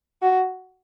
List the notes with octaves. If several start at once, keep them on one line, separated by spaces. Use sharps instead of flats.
F#4